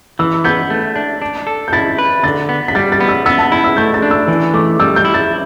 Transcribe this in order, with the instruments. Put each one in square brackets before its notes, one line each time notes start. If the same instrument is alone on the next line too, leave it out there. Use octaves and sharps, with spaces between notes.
[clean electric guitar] E3 [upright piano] E6
[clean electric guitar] B3 [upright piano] G6
[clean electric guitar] A3
D4
D4
A4
[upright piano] G6
[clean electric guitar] E4 [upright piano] A6
[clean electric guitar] B4
[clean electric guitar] D3 [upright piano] A6
[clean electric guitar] B3
[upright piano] B6
[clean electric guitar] G3 [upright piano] A6
[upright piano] A6
[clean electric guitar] B3
[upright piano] E6
[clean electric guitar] B3 [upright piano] E6
[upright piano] A5
[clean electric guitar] E4 [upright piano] B5
[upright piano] E6
[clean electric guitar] A3 [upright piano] G6
[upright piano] A6
[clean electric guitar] D4
[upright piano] E6
[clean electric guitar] E3
[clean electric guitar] A3 [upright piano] D6
[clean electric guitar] G3 [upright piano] E6
[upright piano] G6
[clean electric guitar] E4
[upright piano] A6